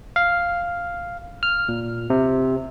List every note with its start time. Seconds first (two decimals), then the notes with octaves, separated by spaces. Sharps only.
0.16 F5
1.43 F6
1.69 A#2
2.10 C3